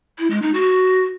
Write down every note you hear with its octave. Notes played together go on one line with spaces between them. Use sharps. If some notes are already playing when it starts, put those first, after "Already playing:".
E4
G#3
D#4
F#4